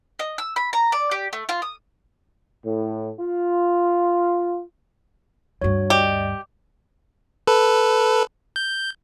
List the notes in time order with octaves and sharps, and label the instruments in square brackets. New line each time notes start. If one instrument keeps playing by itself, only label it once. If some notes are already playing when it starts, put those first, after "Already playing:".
[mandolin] D#5
E6
B5
A#5
D5
G4
A3
F4
D#6
[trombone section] A2
F4
[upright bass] D2 G2 [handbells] D4 F#4 C#5
[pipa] G4 [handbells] D5 D#5
[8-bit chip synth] A4 B4
G6